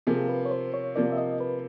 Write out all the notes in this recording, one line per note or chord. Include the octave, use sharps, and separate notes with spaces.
C3 F3 A#3 G#4
B4
C#5
C5
C#5
C3 F3 A#3 D5
E5
D#5
B4